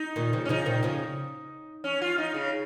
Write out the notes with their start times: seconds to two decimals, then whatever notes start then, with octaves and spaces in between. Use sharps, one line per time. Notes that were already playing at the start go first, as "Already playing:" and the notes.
Already playing: D#4
0.16 A#2 D#3
0.33 C#3 F3
0.45 C#4
0.49 C#3 F3 D#4
0.66 A#2 D#3
0.83 C#3 F3
1.84 C#4
2.01 F4
2.18 D#4
2.34 C#3